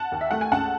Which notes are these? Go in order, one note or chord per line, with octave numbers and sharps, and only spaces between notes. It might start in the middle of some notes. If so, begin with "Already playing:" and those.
Already playing: F#5 A5
D#2
E5
A3 F#5
G#5
C#2 F#5 A5